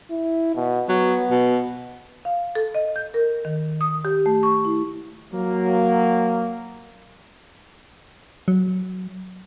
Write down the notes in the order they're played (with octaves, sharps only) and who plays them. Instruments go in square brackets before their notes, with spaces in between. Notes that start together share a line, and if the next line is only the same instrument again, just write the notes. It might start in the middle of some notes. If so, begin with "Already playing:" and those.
[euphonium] E4
B2
[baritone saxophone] F#3 [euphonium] B3
[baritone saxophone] B2
[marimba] F5
A4
D#5
G6
A#4
D#3
D#6
G4
A3
C#6
E4
[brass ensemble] F#3 A#3
[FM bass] F#3